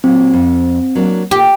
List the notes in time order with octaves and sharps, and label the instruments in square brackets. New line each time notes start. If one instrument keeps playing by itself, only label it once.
[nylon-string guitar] A#2 F#3 [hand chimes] C4
[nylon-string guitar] F2
F#3 A#3 D4
[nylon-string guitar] A#2 [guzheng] G4